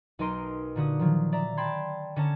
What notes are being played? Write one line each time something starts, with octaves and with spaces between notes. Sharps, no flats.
B1 D#4 A#4 D#5 C6 D7
A#2 D3 F#4 D#6
D#3 F3 F#3
D5 E5 A#5
G5 A5 B5 C6 G#6
D3 C#4 C#5 A5 A#5